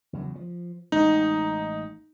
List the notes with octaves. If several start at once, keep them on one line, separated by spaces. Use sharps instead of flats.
E2 C#3 F#3
F3
A1 G#3 D#4